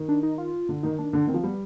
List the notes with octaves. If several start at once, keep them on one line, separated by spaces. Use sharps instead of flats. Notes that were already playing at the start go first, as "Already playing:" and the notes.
Already playing: D#3
D4
D#4
F4
D3
D#3 D#4
D#3 D4
D3 D4
D#3 C4
F3
G3 B3